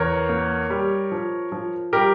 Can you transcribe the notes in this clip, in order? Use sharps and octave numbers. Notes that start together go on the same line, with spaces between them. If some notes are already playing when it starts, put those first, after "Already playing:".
Already playing: E2 A#4 C#5
A#3
G3
F3
F3
G3 G4 A#4